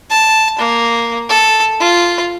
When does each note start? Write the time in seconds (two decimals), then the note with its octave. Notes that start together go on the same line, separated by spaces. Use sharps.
0.10 A5
0.59 A#3
1.30 A4
1.80 F4